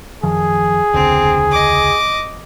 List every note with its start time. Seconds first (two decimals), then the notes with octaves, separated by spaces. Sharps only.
0.23 F#2 D#3 F3 G#4
0.94 E1 C#2 D3 C4
1.52 D#5 D6